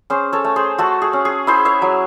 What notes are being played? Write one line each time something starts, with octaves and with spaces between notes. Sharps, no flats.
C#4 G#4 C5
A4 C#5
A3
G#4 C5
A3 F#4 A4
G#4
C#4
G#4
E4 G#4 C5
C#5 E5
F#3